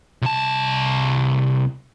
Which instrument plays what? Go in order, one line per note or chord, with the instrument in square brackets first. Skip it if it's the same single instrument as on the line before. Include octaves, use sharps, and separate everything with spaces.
[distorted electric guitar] C2 A5